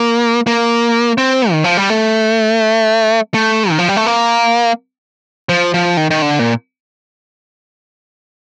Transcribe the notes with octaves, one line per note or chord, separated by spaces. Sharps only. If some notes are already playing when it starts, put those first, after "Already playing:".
Already playing: A#3
A#3
C4
D#3
F3
G3
A3
A3
D#3
F3
G3
A3
A#3
F3
F3
D#3
D#3
D3
A#2